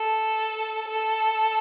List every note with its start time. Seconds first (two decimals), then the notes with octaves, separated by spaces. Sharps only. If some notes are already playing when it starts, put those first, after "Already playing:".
Already playing: A4
0.88 A4